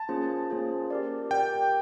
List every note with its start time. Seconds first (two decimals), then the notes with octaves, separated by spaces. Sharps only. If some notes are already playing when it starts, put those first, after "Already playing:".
Already playing: A5
0.09 A#3 C#4 F4 G#4 C5
0.50 A#3 C#4 F4 G#4 C5
0.90 G4 A#4 D5
1.31 G4 A#4 D5 G5